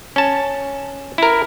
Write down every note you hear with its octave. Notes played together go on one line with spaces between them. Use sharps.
C#4 A5
E4 A#4